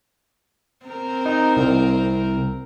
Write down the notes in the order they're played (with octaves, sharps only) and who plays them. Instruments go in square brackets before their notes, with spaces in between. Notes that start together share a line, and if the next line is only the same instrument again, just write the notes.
[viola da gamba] C4 A#4
[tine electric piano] D#4
C2